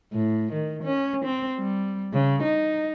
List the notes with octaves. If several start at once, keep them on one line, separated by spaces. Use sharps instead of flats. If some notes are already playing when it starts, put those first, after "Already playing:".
A2
D#3
C#4
C4
G3
C#3
D#4